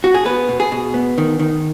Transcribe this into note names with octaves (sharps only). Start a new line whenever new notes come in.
F#4
G#4
B3 B4
B2
G#4
B2
B3
D#3
D#3